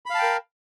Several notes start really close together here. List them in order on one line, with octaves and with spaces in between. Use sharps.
B5 F5 A5 G5 A#4